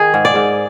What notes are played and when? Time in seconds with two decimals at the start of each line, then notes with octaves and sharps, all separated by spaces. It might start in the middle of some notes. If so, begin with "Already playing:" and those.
Already playing: D#3 G#4
0.14 G#2
0.25 D5
0.35 G#2